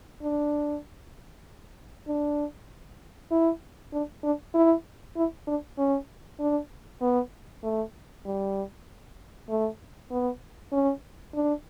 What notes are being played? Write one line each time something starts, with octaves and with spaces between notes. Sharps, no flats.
D4
D4
E4
D4
D4
E4
E4
D4
C#4
D4
B3
A3
G3
A3
B3
C#4
D4